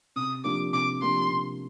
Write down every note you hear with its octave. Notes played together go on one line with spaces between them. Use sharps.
C3 D#6
F3 A#3 D4 G4 D6
C3 D6
F3 A#3 D4 G4 C6
C3